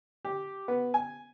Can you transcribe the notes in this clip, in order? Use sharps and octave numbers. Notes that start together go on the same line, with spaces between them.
G4
B3
G#5